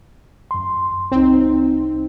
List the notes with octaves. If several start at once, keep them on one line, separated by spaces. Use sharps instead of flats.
F#2 C6
C2 C4 D#4